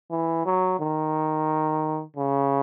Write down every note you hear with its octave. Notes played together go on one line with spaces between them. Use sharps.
E3
F#3
D#3
C#3